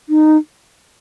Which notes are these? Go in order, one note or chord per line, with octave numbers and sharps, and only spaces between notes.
D#4